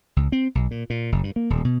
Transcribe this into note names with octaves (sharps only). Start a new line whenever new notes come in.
C#2
C4
B1
A#2
A#2
F#1
G2
A#3
D#1
B2